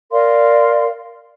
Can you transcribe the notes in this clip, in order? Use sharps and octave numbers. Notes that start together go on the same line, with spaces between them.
A#4 D5 F5 C6